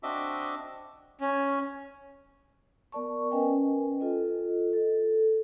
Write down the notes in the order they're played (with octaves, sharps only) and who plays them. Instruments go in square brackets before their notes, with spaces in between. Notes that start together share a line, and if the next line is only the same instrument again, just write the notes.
[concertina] C4 D4 F#4 D#5 E5 D6
[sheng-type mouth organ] C#4
[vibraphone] B3 A#4 D5 A5 C#6
C#4 A#4 B4 D#5 G5 G#5
F4 A4 D#5
A4